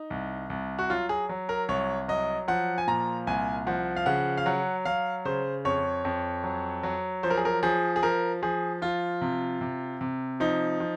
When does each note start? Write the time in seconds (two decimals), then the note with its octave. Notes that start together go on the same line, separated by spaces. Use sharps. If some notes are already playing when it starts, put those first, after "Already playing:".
Already playing: D#4
0.10 C2
0.50 C2
0.78 F#4
0.90 F#3 F4
1.09 G#4
1.29 F#3
1.49 A#4
1.68 C2 C#5
2.08 F#3 D#5
2.48 F3 F#5
2.78 G#5
2.87 A#2 A#5
3.27 C2 G#5
3.67 F3 F#5
3.97 F5
4.06 C#3 F#5
4.37 F5
4.46 F#3 F#5
4.85 F#3 F5
5.25 C#3 C5
5.65 F2 C#5
6.05 F2
6.44 F#3
6.83 F#3
7.23 F3 C5
7.30 A#4
7.37 G#4
7.45 A#4
7.63 F3 G#4
7.96 G#4
8.03 F3 A#4
8.43 F3 G#4
8.82 F3 F4
9.21 C3
9.61 C3
10.01 C3
10.40 F3 D#4
10.80 F3